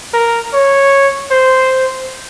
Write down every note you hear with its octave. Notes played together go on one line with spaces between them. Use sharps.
A#4
C#5
C5